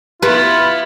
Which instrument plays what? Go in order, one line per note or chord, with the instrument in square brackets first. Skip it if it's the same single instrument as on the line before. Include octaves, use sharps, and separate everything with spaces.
[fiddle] B3 E4 [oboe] F4 [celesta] G4 [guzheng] B4